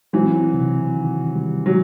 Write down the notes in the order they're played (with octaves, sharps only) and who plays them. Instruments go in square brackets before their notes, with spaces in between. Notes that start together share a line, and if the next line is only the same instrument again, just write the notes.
[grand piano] E3 F#3 [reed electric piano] C4
[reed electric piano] C3
D#3
G3
[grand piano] F#3